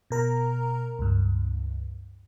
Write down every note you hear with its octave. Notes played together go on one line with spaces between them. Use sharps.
B2 A#4 A#5
C#2 G2